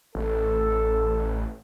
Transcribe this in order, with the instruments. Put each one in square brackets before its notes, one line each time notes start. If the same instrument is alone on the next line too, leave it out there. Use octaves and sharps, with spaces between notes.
[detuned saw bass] A1 [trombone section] A4